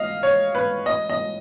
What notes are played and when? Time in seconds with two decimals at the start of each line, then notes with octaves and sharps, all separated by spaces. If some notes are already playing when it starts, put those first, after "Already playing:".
Already playing: D#5 F5
0.23 C#5
0.55 B4
0.86 D#5
1.10 D#5